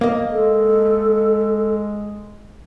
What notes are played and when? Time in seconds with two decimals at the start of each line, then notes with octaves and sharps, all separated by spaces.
0.01 A#3 D#5
0.31 G#3 A4